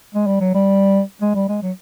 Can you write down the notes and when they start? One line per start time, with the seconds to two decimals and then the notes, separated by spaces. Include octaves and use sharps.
0.15 G#3
0.27 G3
0.41 F#3
0.54 G3
1.22 G#3
1.34 G3
1.49 G#3
1.62 F#3